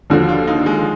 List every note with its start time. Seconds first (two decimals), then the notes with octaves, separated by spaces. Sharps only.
0.10 D#2 D3 F3 F#4
0.29 F4
0.47 D#4
0.66 G#3